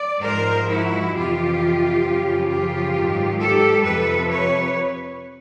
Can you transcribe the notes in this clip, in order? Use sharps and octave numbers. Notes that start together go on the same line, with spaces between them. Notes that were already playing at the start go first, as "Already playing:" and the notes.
Already playing: D5
G#2 F3 A#4 C5
E4 F#4
F2 C3 E3 F4 G4
F#2 C#3 F3
F4 G4
G#2 D#3 F#3
G4 A4
F2 C3 F3 A4 B4
B4 C#5